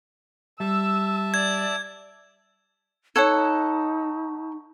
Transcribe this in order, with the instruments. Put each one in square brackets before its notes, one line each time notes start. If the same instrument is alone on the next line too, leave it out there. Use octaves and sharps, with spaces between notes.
[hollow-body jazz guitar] G3 [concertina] E5 A5 [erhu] E6
[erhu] D5 [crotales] G#6
[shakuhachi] D#4 [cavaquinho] A4 F#5 [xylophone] C#5 G#6 [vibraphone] C#6